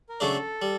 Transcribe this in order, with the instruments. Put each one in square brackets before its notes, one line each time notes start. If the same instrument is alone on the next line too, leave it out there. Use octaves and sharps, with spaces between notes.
[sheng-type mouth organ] A#4
[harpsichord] C#3 F#3 A3 D4 [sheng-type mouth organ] A4
[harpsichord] G3